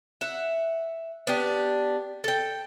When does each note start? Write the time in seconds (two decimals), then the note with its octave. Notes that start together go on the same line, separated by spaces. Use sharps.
0.21 E5 F#5
1.27 B3 D4 G4
2.24 A4 G5